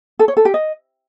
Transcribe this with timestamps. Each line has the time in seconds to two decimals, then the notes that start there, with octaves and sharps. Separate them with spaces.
0.19 A4
0.28 C#5
0.37 A4
0.45 G4
0.54 D#5